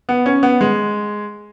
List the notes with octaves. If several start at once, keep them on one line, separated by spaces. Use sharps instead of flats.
B3
C#4
B3
G#3